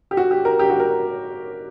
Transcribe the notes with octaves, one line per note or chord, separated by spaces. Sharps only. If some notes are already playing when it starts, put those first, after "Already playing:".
G4
F#4
G4
A#4
G4
F#4
A#4